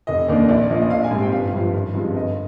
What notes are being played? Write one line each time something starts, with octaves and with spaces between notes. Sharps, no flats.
F1 D#5
D#2 D#3 A#3 D4 D5
A#1 D5
A#2 F3 A#3 D#5
D#5
A#1 F5
G#5
G#2 G3 C4
G5
G1 F5
G2 F3
G#1
G2 F3 G#3 C4
G1 D#5